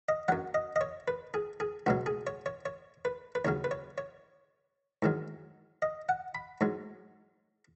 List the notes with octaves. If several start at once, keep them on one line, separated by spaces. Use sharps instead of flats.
D#5
F#2 F#3 F#5
D#5
D#5
C#5
B4
G#4
G#4
C#2 B2 F#3 F#4
G#4
C#5
C#5
C#5
B4
B4
D#2 C#3 F#3 C#5
B4
C#5
C#5
G#2 D#3 F#3
D#5
F#5
B5
G#2 F#3